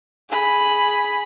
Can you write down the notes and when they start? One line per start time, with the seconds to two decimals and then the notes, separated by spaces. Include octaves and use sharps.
0.30 G#4 B5